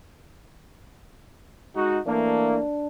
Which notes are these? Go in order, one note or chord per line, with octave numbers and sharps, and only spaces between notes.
G#3 D#4 F#4
E3 A3 A#3 D4